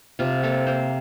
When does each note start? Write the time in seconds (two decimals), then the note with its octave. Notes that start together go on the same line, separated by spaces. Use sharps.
0.19 C3 F4
0.43 A#3 A4
0.67 A#3 C5